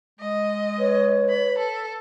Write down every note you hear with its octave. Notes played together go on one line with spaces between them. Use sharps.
G#3 D#5
B4 C#5
B5
A4